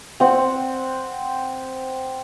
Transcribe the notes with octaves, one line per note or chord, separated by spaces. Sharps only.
C4 F#5